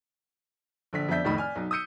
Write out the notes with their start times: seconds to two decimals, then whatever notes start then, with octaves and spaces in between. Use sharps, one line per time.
0.93 A#1 D3 B6
1.09 F2 B3 D4 E5 G6 B6
1.24 F1 A2 D#3 A3 D#5 B5
1.37 D5 G#5 F6
1.55 B1 D#4
1.71 D#6 E6 G6 C#7 D#7